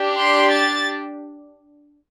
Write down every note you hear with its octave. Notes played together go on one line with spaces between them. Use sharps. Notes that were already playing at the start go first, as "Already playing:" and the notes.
Already playing: D4 G4
C6
A6